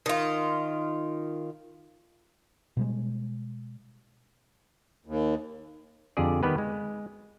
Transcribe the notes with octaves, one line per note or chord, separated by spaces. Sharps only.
D#3 F4
B2 G3 G#3
D#2
F2 D3 G4 G#4 D5
D#3 G3 B3 G4 B4
G#3